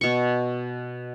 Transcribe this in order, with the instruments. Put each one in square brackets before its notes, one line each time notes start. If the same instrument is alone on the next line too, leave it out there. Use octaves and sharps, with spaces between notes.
[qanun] B2 C#6